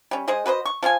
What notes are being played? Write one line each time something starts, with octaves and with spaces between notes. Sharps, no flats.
G3 C#4
G#3 G#4 C5 D#5
F#4 B4 C5 D#5
C#6
F3 F4 G#4 G#5